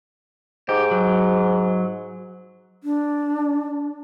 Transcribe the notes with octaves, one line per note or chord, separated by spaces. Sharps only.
G#2 G4
F#3
D4